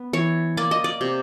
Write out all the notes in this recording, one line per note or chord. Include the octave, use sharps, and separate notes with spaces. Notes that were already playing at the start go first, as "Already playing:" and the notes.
Already playing: B3
E3 C#5
A#3 D5
D#5
D5
C3